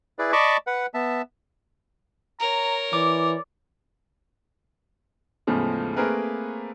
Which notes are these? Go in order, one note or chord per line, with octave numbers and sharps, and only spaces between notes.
E4 G#4 B4 D5
D5 D#5 A5 B5 C#6 D6
B4 F#5
B3 E5 A5
A#4 C#5 A#5
E3 D5 D6
E2 A2 C#3 F3 G#3
A3 A#3 C4 G#4 A#4 B4